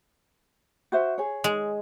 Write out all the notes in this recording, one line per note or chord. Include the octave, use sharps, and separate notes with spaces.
F#4 C5 E5
G#4 C#5
G#3